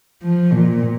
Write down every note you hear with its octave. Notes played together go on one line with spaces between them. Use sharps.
F3
A#2